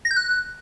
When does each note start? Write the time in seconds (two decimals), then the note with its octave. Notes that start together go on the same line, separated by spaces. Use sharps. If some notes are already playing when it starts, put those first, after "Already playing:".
0.05 A#6
0.11 G6
0.17 F#6